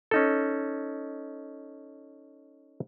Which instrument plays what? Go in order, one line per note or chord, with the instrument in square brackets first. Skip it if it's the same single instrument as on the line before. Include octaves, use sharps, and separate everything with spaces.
[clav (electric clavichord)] C#4 D#4 A4